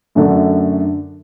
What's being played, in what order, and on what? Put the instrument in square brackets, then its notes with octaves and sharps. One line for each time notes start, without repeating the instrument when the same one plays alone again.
[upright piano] F#2 D3 A3 D4